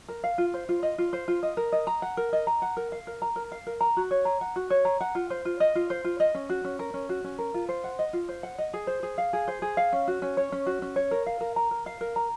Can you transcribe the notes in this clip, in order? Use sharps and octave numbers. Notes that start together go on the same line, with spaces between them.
A#4
F5
F4
C5
F4
D#5
F4
C5
F4
D#5
A#4
D#5
A#5
F#5
A#4
D#5
A#5
F#5
A#4
F5
A#4
A#5
A#4
F5
A#4
A#5
F#4
C#5
A#5
F#5
F#4
C#5
A#5
F#5
F4
C5
F4
D#5
F4
C5
F4
D#5
C#4
F#4
C#4
A#4
C#4
F#4
C#4
A#4
F4
C5
F#5
D#5
F4
C5
F#5
D#5
G#4
C5
G#4
F5
G#4
C5
G#4
F5
C#4
F#4
C#4
C#5
C#4
F#4
C#4
C#5
A#4
F5
A#4
A#5
A#4
F5
A#4
A#5